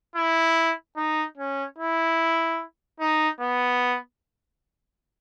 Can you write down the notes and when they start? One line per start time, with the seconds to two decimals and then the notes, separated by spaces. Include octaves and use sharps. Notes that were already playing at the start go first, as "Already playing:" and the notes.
0.16 E4
0.97 D#4
1.37 C#4
1.78 E4
3.00 D#4
3.41 B3